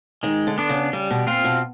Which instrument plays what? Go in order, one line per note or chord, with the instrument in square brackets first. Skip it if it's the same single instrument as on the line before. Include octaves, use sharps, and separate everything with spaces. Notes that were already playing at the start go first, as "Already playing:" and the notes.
[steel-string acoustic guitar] D#3 [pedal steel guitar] G#3
[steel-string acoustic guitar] D3
[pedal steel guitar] B3 D4
[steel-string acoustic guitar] C#3
[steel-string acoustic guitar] C#3 [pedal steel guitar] G3
[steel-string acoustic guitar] B2
[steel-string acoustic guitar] A#2 [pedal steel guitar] C4 F4
[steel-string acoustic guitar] B2